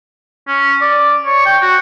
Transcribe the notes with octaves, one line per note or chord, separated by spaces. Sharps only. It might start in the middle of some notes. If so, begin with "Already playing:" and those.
C#4
D5
C#5
G5
F#4